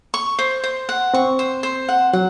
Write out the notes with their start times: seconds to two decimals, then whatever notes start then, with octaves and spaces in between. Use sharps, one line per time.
0.14 C#6
0.39 C5
0.64 C5
0.89 F#5
1.14 C4 C#6
1.39 C5
1.63 C5
1.89 F#5
2.13 F#3 F#5